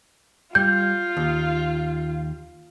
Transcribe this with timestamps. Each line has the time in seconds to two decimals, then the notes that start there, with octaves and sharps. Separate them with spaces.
0.55 G3 F4 G6
1.17 D#2